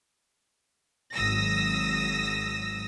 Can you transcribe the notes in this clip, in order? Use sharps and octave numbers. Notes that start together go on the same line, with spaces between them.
G#1 F#3 D#6 E6 A#6